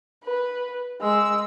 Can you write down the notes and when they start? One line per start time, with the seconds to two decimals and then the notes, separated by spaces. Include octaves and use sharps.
0.24 B4
1.01 G#3 E6